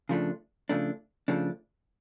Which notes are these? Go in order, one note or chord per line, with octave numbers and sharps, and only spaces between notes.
C#3 F3 A3 D4
C#3 F3 A3 D4
C#3 F3 A3 D4